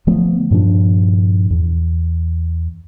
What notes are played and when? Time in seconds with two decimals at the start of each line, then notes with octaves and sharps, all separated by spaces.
0.07 D3 F3 A3 B3
0.51 G2 A#2 F3 D4
1.50 E2